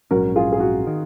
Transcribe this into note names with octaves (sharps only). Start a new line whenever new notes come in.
A#1 G#2 F#3 C#4 F#4 A#4
F4 G#4
G#4
F#4
D#3